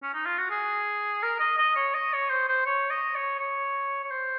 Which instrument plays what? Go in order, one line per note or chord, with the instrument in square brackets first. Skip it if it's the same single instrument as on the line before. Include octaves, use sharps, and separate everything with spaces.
[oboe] C#4
D#4
F4
F#4
G#4
A#4
D#5
D#5
C#5
D#5
C#5
C5
C5
C#5
D#5
C#5
C#5
C#5
C5